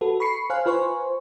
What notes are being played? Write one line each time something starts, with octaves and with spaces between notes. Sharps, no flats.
F#4 A4 B4
B5 C#6 C7 C#7
C5 F5 G#5 F6 F#6
F4 B4 C5 G#5 C6 C#6